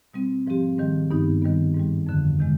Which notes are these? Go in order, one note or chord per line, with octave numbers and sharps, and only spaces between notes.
B2 G3 C4
G#2 F3 C4 G4
G#2 D#3 G3
G2 D#3 B3 D#4
D#3 G3 B3
G#2 D#3 G3
F2 D3 F3
C3 D#3 G#3